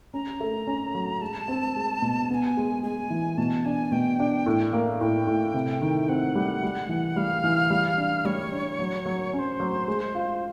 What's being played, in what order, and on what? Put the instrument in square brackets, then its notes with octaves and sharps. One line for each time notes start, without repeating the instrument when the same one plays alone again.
[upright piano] C#4 [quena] A#5
[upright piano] A3
C#4
F#3
[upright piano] G#3 [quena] A5
[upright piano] C4
G#3
B2
[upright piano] B3 [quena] G#5 A5
[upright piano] G#3
[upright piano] G#3 [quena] G#5
[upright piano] E3
[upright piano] B2 [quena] A5
[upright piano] D4 [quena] G#5
[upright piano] B2 [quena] G5
[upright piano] D4
A2
A#3
[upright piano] A2 [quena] G5
[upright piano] A2
C3
D#3
[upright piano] C4 [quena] F#5
[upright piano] G3
G3
E3
[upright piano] G3 [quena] F5
[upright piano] E3
G3
D4
[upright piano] G3 [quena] C#5
[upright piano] D4
F#3
F#3
[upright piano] C#4 [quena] C#5
[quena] C5
[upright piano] F#3
G#3
F4